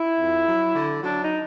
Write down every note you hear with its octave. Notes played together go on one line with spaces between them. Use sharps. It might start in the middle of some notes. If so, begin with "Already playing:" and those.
Already playing: E4
F2
F#3
D3
F#3 D4
D#4